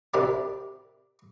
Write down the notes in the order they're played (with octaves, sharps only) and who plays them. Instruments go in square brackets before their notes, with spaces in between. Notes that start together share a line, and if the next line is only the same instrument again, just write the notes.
[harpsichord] C3 D4 G4 A#4 D5 B5